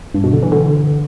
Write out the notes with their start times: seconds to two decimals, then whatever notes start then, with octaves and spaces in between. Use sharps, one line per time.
0.14 G2
0.24 B2
0.33 D3
0.43 E3
0.52 D3